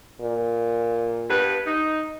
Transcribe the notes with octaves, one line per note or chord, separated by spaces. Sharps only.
A#2
G2 B3 B4
D#4